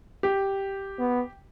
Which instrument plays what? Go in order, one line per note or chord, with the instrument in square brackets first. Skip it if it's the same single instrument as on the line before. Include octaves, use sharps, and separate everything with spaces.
[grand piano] G4
[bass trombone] B3